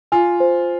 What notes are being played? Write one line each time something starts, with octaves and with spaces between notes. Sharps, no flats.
F4 G#5
C5